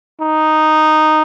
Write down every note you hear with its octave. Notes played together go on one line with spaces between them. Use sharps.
D#4